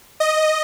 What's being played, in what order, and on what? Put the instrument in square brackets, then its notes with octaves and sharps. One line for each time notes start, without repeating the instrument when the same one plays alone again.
[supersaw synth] D#5